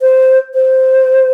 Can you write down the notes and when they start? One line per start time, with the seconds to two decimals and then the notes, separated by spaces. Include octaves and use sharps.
0.01 C5
0.54 C5